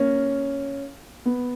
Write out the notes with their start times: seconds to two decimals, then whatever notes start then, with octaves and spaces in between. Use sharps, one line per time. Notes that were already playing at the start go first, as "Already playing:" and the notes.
Already playing: A#3 C#4
1.26 B3